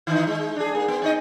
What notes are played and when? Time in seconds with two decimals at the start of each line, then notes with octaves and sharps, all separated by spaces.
0.07 D#3 E3 D#4
0.27 G#3
0.56 D4 G#4
0.75 A#3
0.88 B3
1.02 C4 D#4 D#5